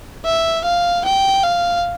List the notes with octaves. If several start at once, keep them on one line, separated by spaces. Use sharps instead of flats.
E5
F5
G5
F5